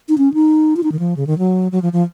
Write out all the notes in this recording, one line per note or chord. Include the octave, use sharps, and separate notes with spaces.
D#4
C#4
D#4
F4
D#4
D#3
F3
C#3
D#3
F#3
F#3
F3
F3